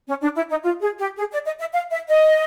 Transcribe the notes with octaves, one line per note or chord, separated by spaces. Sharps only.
C#4
D4
E4
D#4
F4
G#4
G4
G#4
D5
D#5
E5
F5
E5
D#5